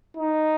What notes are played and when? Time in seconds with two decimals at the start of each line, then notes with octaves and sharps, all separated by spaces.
0.17 D#4